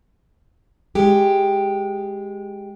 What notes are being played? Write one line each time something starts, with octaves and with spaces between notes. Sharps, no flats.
G#3 G4